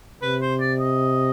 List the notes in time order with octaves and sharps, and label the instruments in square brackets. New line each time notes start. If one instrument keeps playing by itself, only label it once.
[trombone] C3 [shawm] B4
[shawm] C5
D5
D#5